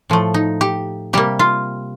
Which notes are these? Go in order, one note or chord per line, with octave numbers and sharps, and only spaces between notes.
A2 F3 A3
D#4
G4
C3 G3 A#3 G4
F4